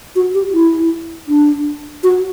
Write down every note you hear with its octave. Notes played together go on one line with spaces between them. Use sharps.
F#4
G4
E4
D4
F#4